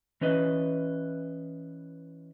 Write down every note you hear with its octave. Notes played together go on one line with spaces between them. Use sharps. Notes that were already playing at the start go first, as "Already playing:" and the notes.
E3 C#4 B4 D#5